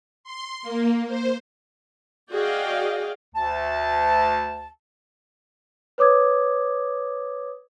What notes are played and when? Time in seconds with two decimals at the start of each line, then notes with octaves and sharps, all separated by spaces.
0.24 C6
0.63 A#3
1.07 C5
2.31 F#4 G#4 D5 D#5 F5 G5
3.35 D2 A5
5.98 B4 C#5 D6 D#6 G#6